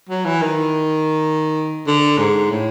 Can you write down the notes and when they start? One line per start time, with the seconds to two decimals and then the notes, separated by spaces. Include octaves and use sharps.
0.09 F#3
0.25 E3
0.42 D#3
1.87 D3
2.18 G#2
2.51 A2